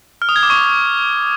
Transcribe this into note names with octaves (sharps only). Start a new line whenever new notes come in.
F6
D#6
G#6
D6
C#6